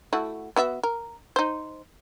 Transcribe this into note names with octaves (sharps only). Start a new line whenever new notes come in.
A3 E4 F#4
B3 F#4 E5
A#4
D#4 C5